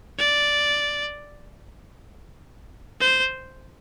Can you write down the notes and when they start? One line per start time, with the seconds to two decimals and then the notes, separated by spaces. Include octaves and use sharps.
0.18 D5
3.01 C5